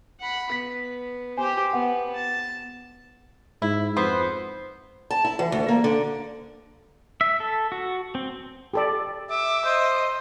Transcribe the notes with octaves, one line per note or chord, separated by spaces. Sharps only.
F#5 B5
B3 B6
G4 C5 G#5
B3 F#5
A5
G#2 E4
F2 E3 B3 C5
A5
E4
E3
D2
A#3
D3
E5
A4
F#4
C4
G4 A4 D5
E5 D6
C5 D#5